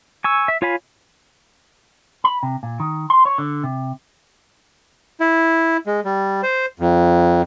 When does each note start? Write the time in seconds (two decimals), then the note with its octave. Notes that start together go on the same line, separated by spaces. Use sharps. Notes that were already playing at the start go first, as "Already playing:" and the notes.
0.24 G#5 C#6 E6
0.48 E5
0.62 F4 C#5 F5 G#5 B5
2.24 B5
2.43 C3
2.63 A#2
2.80 D#3
3.10 C6
3.25 C#5
3.38 D3
3.64 C3
5.20 E4
5.86 G#3
6.05 G3
6.43 C5
6.79 F2